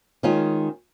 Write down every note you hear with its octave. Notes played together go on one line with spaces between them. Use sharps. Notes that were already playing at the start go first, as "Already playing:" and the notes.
D#3 G#3 C#4 F4